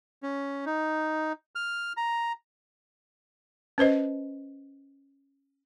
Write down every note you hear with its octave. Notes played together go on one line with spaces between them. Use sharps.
C#4
D#4
F6
A#5
C#4 B4 C5 D#5